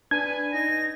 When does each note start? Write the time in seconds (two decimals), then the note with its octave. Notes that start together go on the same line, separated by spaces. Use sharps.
0.11 D4 B4 G#5 G#6
0.53 D#4 A#6